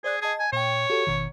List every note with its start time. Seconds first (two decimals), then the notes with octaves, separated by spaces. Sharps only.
0.04 G#4 C5 D5 F#6
0.21 G#4 D#5 A5 G#6
0.40 G#5
0.53 A#2 C#5 G5
0.90 F#4 G4 A4
1.07 G#1 B2 D#3